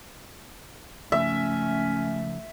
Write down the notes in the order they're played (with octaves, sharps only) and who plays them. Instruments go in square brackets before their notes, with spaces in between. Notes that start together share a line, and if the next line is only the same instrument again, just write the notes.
[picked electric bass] C#3 F3 [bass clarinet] A3 [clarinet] C#4 [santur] E5